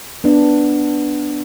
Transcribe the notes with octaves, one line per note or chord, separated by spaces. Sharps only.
B3 D4